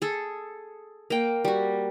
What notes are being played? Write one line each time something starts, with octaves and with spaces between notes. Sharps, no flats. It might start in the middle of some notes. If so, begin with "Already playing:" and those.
G#4 A4
A#3 G5
G3 F#4